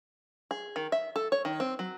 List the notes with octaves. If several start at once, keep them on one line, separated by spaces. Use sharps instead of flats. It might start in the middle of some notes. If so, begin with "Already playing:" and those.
G#4
D#3
E5
A4
C#5
D#3
C4
F#3